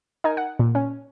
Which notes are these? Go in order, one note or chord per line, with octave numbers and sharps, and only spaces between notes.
D#4 A#4 G#5
F#5
A#2
C#4